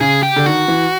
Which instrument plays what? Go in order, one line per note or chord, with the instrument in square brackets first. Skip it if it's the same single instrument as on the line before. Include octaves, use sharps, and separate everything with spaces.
[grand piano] C#3 [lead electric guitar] G#4
[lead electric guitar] G4
[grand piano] D3
[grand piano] D#3 [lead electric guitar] F#4
[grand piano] E3